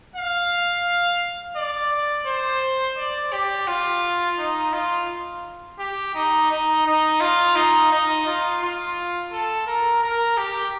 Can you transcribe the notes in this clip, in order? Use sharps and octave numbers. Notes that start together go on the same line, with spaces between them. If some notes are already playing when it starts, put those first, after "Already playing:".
F5
D5
C5
D5
G4
F4
D#4
F4
G4
D#4
D#4
D#4
F4
D#4
D#4
F4
F4
A4
A#4
A#4
G4